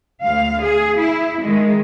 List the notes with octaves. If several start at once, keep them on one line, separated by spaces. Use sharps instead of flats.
D2 F5
G#4
E4
D#3 G#3